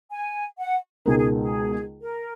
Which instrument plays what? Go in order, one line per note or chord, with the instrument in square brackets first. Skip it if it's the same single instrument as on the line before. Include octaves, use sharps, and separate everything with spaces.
[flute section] G#5
F#5
[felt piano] C#2 B2 G#3 D#4 A#4 [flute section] G#4
[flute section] G#4
G#4
A#4